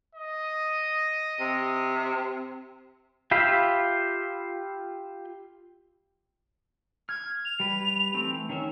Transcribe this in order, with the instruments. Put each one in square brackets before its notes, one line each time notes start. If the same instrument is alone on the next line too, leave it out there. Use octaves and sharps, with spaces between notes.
[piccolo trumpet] D#5
[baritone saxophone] C3
[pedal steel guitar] F4 G4 E5 F5 B5
[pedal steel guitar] F6 [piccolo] G#6
[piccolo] F7
[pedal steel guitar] G3 B4
E3 A3 C4
D#3 C#4 E5